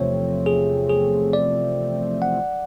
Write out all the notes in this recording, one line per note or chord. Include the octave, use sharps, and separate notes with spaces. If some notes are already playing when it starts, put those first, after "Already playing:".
Already playing: E2 C3 F3 A3 C4 C#5
G#4
G#4
D5
F#5